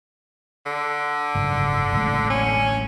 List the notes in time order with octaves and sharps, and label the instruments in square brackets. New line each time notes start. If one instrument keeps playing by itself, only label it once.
[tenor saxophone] D3
[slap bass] F#1 G#2
D1 A1 G#3
[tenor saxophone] C#4